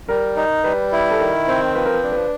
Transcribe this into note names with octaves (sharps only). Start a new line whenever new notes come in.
G3 A#4
D#4
G3 B4
E4
A4
D#3 A#4
C4
F3 B4
A#4
B4
D4
B4